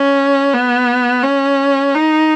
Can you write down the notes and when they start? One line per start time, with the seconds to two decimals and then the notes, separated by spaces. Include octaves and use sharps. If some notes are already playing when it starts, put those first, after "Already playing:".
Already playing: C#4
0.53 B3
1.23 C#4
1.94 D#4